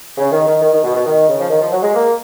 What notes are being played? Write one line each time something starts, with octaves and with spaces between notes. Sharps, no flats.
C#3
D#3
D#3
D#3
D#3
B2
B2
D#3
C#3
F3
D#3
F3
F#3
G#3
A#3